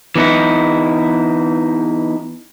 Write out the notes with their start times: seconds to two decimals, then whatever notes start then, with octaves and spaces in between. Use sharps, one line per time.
0.16 E3 B3 D#4 E4